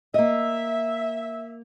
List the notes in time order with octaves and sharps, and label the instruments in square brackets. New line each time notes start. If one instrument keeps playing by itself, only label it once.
[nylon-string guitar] A#3 D#5 [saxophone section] E5